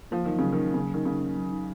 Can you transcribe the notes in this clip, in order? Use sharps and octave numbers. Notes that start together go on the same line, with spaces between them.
F3 A#3
D#3 F#3
C#3 F#3
D#3
C#4
C#3 A#3
D#3 F#3
C#3 F#3
C#4
F#3
D#4